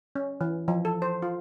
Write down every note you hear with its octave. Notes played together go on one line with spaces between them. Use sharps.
C#4
E3
F3
A4
C5
F4